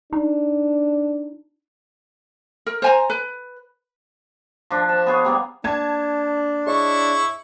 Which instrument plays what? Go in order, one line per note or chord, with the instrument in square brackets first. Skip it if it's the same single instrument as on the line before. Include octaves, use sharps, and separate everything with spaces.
[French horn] D4 [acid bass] D#4
[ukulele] A#4
C5 G#5 A#5
B4
[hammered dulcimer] F3 D4
A5
B3 G#4 C#5
G3 A#3 B3
[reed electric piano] A#3 [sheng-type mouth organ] D4 [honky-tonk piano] A5 G#6
[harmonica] E4 C#6 [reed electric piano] G#4 C#5 D#5